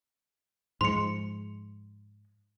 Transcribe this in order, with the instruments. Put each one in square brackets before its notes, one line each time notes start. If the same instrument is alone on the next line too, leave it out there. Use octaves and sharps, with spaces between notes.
[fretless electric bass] G#2 F3 G#3 [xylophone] C6 C#7